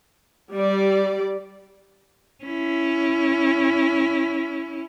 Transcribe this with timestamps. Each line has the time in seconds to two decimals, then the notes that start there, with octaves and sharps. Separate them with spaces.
0.54 G3 D5
2.44 C#4 E4